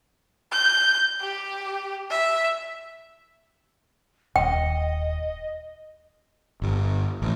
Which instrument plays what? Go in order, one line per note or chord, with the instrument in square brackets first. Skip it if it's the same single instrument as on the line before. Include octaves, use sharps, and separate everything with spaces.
[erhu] G6
G4
E5
[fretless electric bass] D#1 [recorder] D#5 [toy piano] G5
[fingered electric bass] G1
A1